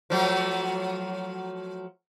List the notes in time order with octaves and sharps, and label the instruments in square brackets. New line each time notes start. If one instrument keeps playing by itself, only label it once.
[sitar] F3 F#3 A3